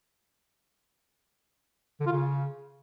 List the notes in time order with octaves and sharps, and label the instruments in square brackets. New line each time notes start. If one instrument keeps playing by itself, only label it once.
[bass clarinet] D3
F4
C#3